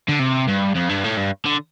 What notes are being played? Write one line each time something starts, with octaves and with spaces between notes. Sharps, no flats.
D3
C3
G2
F2
G2
A2
G2
D3